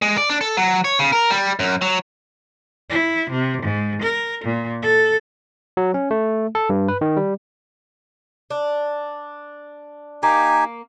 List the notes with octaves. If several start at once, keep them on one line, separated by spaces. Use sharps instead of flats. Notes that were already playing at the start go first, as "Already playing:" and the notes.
G#3
D5
D4
A4
F#3
C#5
C#3
A#4
G3
F#2
F#3
E4
C3
G#2
A#4
A#2
A4
F#3
C#4
A3
A4
G2
B4
D#3
G3
D4
A#3 D#4 G4 G#5